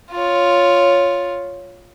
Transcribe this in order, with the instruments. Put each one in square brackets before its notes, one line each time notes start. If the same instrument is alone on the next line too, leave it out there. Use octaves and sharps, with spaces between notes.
[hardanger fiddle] F4 C#5